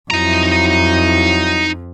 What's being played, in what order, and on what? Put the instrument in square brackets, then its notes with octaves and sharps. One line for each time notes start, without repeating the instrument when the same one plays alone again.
[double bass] F2 [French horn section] F#3 E4 [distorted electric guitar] D#4 A#5